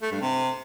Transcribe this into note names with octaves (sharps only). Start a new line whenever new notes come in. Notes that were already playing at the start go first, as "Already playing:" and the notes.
A3
G2
C3